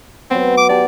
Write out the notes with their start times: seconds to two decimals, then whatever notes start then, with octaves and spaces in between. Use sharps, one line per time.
0.31 F#3 B3 C4
0.57 D6
0.69 G4 D5 A5